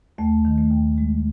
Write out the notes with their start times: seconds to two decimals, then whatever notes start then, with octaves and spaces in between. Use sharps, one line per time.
0.18 D#2 A3
0.45 D#3
0.58 A3
0.71 D#2
0.98 G#3